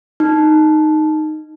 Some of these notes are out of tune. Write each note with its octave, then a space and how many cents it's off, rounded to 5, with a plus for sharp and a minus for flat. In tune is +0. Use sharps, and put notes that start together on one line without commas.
D#4 -5